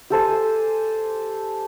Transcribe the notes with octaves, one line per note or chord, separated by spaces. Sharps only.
G4 A4 C5 G#5